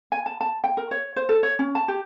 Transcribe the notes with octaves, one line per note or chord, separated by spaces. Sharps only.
G#5
A5
A5
G5
A#4
C#5
C5
A4
C#5
C#4
A5
G4